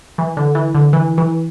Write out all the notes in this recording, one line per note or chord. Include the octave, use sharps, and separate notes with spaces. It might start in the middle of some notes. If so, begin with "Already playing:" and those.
E3
D3
E3
D3
E3
E3